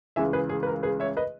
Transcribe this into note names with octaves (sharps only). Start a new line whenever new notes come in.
C#2 C#3 E3 E5 G#5
G#4 B4
G#4
B4
A#4
G#4 B4
C#5 E5
B4 D#5